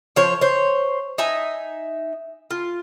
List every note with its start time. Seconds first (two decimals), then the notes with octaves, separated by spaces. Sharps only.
0.16 F3 C5 C#5
0.41 C5 C#5
1.18 D#4 E5 G#5
2.51 F4